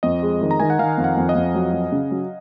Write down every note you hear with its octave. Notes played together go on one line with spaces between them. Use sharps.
F2 D#5
G#3
D#3
A#5
D#3 G#5
F#5
D#3 F5
F2
F#5
F2
D#5
F2
F#3
F#3
C#3
F#3